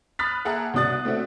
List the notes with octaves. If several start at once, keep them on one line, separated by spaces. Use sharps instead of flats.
B5 D#6 F6 F#6 A6 B6
A#3 G#4 E5 F#5 A5 A#5
C2 B2 D4 D#6 F#6 A6
A3 C4 D4 F#4 E5